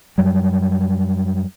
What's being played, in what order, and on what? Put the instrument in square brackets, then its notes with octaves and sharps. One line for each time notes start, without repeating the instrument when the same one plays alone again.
[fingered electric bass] F#2 F#3 G3